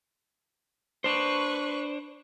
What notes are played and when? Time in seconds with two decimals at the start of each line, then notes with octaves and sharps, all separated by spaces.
1.04 D4 B4 C5 C#6